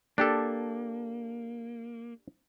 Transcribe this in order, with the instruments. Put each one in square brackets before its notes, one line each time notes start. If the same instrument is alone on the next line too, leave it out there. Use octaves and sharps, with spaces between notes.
[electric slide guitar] A#3 [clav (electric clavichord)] D4 G4 A4